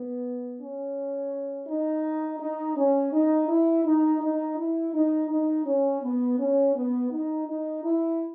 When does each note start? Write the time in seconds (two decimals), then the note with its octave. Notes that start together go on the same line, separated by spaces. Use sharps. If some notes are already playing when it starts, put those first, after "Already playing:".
Already playing: B3
0.59 C#4
1.67 D#4
2.40 D#4
2.77 C#4
3.13 D#4
3.49 E4
3.85 D#4
4.22 D#4
4.58 E4
4.94 D#4
5.30 D#4
5.66 C#4
6.02 B3
6.39 C#4
6.75 B3
7.11 D#4
7.48 D#4
7.84 E4